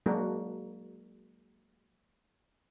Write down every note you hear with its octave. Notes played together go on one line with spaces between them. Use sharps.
F#3 G#3 A#3 D4 F#4 A#4